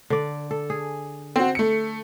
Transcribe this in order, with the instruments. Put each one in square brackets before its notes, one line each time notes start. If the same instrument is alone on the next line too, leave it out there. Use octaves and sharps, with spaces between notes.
[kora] D3 D5
A4
G#4
[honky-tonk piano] C4 F#4
A3 C#7